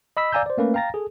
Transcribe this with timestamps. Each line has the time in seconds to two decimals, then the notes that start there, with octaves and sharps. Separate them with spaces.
0.17 D#5 B5 E6 B6
0.32 D5 F5 G#5 A#5 E6 G6
0.46 C5 D5
0.57 A3 A#3 C#4 B4
0.74 F5 G5 A#5 A6 A#6
0.94 G#4 A4